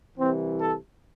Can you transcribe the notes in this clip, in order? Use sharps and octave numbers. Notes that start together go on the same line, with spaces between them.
C2 C3 E3 C4
A4